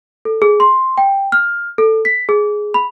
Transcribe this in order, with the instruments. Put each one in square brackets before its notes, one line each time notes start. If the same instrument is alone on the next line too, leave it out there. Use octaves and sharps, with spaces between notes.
[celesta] A4
G#4
C6
G5
F6
A4
B6
G#4
B5